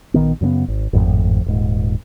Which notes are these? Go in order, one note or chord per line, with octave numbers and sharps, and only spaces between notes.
A#1 D#3 B3
F#2 C#3 A3 B3
G#1
G#1 F2 A2
D#1 G#2